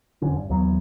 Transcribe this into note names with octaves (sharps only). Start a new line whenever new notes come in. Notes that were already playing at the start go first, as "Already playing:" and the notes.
E1 F2 D3 C#4
G2
D#2 E3 F#3 B3